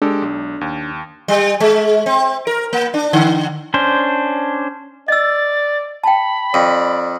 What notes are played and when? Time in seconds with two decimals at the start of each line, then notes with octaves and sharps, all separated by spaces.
0.02 G#3 D4 G4 A4
0.22 B1
0.61 D#2
1.28 G3
1.60 G#3
2.06 C4
2.47 A#4
2.73 A#3
2.94 D4
3.13 D3
3.74 C#4 D4 C5
5.08 D5 D#5 E6 A6
6.04 G5 A5 B5
6.54 F2 D5